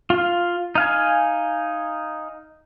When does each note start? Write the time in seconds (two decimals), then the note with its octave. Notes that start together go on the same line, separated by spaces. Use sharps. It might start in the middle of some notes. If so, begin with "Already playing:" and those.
0.10 F4 F5
0.75 D#4 F5 G#5